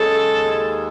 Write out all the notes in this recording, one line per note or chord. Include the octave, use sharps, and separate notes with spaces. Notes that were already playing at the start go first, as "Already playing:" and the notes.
Already playing: C#3 G#3 A4
D#2